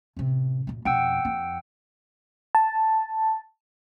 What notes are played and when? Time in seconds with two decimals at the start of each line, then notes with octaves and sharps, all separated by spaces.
0.17 A1 C3
0.67 F#2 A#2
0.85 F2 B2 F#5 G5 E6
1.25 F2
2.55 A5